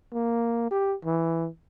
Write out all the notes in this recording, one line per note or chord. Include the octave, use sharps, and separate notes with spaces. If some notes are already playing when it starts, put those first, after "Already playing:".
A#3
G4
E3